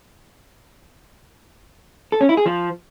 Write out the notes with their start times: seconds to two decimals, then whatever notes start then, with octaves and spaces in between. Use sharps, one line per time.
2.12 A4
2.21 C#4
2.29 E4
2.37 G#4
2.46 F3